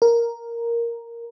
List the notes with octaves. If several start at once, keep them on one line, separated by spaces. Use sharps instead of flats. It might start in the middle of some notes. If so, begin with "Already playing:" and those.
A#4